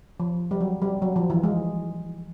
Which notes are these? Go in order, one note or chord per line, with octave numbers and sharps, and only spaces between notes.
F3
G3
F#3
G3
F#3
F3
E3
G#3